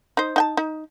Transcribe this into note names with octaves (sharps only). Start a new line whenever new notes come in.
D#4 C5
D#4 G5 A5
D#4